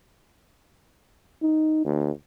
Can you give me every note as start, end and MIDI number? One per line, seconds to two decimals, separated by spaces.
1.42 1.84 63
1.85 2.11 38